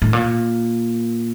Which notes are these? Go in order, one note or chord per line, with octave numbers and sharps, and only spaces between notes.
A2
A#2